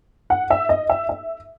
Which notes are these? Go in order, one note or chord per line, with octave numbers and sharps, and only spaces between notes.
F#5
E5
D#5
E5
E5